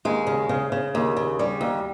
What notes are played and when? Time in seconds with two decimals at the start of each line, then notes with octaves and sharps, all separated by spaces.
0.05 D#2 G#3
0.27 C#3
0.49 C#3
0.72 C#3
0.95 D#2
1.17 C#3
1.39 G3
1.61 D#2